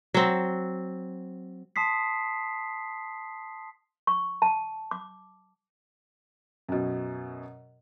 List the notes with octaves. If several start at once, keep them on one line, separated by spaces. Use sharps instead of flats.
F#3 C4
A5 C6 D#6 B6 C7
C#6
A5
D6
F#2 B2